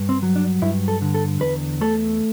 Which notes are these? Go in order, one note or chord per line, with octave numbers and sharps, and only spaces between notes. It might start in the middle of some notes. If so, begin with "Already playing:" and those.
Already playing: G2
C4
F#3
D4
G2 E4
A4
D3
A4
E2 B4
A3 A4